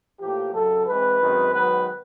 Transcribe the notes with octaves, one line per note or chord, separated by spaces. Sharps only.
A2 F3 A#3 G4
F#2 C#3 F#3 A4
G#2 E3 G#3 C4 B4
F#2 D#3 G#3 C4
G#2 D#3 F#3 B3 B4